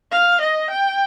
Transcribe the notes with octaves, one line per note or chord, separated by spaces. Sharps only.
F5
D#5
G5